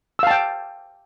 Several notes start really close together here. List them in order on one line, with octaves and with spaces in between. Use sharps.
E6 F5 A5 G5